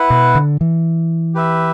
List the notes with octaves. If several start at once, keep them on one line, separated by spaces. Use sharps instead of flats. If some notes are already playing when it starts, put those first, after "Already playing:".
Already playing: E4 B4 F#5
B2
D3
E3
G4 B4 E5